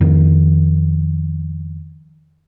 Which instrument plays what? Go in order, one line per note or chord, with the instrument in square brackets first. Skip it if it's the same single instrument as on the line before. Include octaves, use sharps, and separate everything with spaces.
[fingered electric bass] F2 D#3